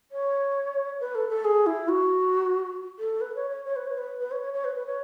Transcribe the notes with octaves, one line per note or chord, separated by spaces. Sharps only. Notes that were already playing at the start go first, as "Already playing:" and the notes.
C#5
B4
A4
A4
G#4
E4
F#4
A4
B4
C#5
C#5
C#5
B4
C#5
B4
B4
C#5
C#5
C#5
B4
B4
C#5